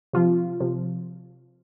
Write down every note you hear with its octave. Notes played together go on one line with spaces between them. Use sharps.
C3 F3 F4
C3 F3